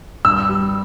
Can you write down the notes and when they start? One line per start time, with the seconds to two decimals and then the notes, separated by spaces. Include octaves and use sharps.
0.25 G2 E6
0.49 G3